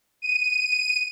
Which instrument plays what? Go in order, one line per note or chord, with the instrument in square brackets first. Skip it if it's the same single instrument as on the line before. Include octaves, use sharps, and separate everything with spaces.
[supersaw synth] D#7